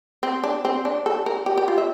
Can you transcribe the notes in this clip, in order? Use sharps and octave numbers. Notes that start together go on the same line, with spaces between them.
C4
D4
C4
D4
A4
A#4
G4
G4
F4
E5